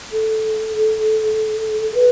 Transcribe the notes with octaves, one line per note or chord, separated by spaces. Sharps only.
A4
B4